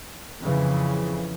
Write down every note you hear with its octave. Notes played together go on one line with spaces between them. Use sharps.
F2 C#3 E3